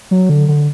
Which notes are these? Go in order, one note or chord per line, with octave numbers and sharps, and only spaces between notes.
F#3
D3
D3